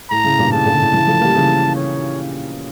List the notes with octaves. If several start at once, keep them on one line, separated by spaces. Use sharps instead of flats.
A2 A#5
A2 C#3
G2 A#2
A2 C#3 A5
A#2 D3
A2 C#3
C#3 E3
F3 A3
G3 A#3
C#3 E3
C#5